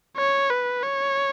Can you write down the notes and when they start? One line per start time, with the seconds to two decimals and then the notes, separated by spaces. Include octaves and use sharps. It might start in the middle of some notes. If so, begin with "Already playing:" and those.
0.17 C#5
0.50 B4
0.83 C#5